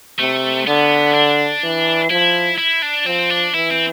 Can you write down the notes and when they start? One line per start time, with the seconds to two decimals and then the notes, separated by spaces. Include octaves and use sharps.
0.19 C3 A3
0.67 D3 B3
1.14 D4
1.63 E3
2.11 F3 E4
2.58 E4
2.82 D4
3.06 F3 C4
3.30 D4
3.54 E3 E4
3.70 C4